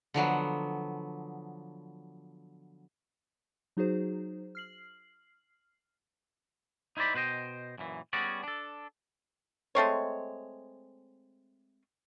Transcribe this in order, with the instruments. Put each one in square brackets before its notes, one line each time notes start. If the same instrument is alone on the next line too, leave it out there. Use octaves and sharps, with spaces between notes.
[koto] D3 F3 F#3 B3
[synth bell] F#3 D#4 F#4 G#4 C5
F6 C7 F#7
[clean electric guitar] D#4 E4 C5 D5 B5
B2 B4 C5 D#5 G5
F#2 A#2 E3
G3 B3 C#4 F#4 G#4 D5
D4 A4
[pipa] G#3 A3 C4 C#5